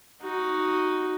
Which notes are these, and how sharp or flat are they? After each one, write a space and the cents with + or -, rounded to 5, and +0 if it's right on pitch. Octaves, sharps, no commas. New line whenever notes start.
D#4 +0 F#4 +0